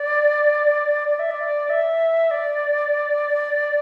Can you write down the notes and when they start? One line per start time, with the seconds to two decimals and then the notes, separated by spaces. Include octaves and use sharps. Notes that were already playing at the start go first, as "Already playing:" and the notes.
Already playing: D5
1.09 D5
1.19 E5
1.31 D5
1.70 E5
2.31 D5